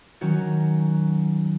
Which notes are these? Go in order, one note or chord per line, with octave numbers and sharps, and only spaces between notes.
D#3 F#3 C#4 F#4